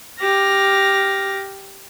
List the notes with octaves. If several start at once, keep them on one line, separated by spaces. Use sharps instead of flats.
G4 F6 A#6